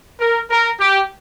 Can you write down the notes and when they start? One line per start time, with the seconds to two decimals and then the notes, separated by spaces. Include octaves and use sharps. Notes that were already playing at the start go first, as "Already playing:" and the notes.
0.20 A#4
0.50 A#4
0.80 G4